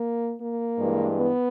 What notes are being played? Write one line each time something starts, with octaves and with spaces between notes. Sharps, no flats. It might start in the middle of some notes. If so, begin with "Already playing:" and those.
Already playing: A#3
A#3
G2 E3 G#3
B3